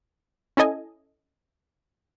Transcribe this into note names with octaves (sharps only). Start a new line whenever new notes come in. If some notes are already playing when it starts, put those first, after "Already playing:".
C#4 E4 A4 D#5 G#5